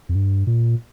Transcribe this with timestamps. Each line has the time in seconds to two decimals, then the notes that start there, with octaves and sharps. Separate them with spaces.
0.09 F2
0.15 G2
0.47 A#2